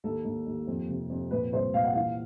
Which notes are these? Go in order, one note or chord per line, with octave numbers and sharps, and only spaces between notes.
D#2 A4
D#2
D#2
F2
C3
F2
A#2 B4
C2 C5
A#2 F5
F#5
E3 F5